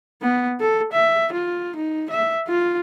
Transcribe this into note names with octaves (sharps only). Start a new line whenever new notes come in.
B3
A4
E5
F4
D#4
E5
F4